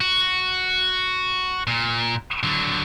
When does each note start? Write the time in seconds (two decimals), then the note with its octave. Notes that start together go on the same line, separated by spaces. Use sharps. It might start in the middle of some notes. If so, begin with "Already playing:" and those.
0.01 F#4
1.67 A#2
2.43 D3 F#3